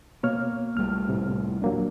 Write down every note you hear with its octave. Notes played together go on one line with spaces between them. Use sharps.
B2 A#3 C#5 F6
C2 G3 A3 F6
A2 C3
D#1 F#3 A#3 D4